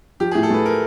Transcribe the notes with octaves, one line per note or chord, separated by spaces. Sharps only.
F3 G4
G#4
A2
A4
A3 B4
A#4